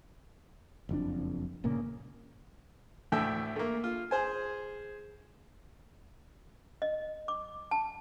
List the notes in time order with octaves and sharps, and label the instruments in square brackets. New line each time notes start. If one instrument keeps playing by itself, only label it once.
[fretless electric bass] F#1 F2 D4
G1 A#2 C#3 A#3
[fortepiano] D2 A2 D3 E5 G5
A3 A#3
F4
G#4 C5 G#5
[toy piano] D#5
D6
A5